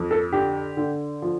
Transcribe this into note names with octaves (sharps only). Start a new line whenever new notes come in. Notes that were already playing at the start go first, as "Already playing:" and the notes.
Already playing: F2
A4
D3 G4
D3
F3